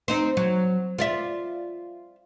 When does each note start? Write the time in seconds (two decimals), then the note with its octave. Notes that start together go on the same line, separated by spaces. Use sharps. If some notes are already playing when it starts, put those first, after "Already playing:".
0.08 C4 D#4 C5
0.37 F#3
0.98 F4 D5 E5